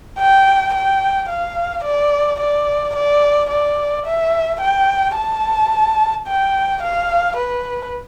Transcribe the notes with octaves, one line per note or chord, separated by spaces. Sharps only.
G5
G5
F5
D5
D5
D5
D5
E5
G5
A5
G5
F5
B4